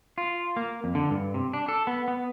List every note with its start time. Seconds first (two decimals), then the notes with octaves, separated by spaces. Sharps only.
0.18 F4
0.56 A#3
0.84 F2
0.95 D3
1.10 G2
1.34 C3
1.53 D4
1.68 A4
1.87 B3
2.08 B3